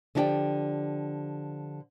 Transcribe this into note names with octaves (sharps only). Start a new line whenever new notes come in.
D3 F3 E4 G4 D5 G5